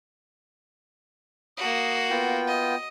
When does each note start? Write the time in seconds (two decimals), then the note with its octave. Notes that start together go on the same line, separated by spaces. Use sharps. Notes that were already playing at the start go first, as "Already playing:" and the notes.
1.58 A#3 F#4 D#6
2.10 B3 F4 G5
2.48 D#5